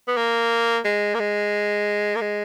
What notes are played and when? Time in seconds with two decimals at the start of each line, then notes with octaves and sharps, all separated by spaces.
0.08 B3
0.17 A#3
0.84 G#3
1.15 A#3
1.20 G#3
2.15 A#3
2.21 G#3